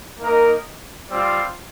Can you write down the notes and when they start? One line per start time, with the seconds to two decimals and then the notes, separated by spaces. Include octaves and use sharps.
0.18 A#3 D#4 A#4 D#5
1.08 G3 C4 F4